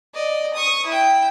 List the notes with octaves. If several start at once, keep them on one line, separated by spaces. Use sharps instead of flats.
D5 D#5
C#6 D#6
E4 G5